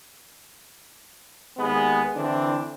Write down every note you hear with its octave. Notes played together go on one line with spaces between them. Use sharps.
D#2 G#3 B3
D3 E3 C4 D4